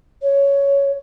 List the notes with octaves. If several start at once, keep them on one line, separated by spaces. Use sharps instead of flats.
C#5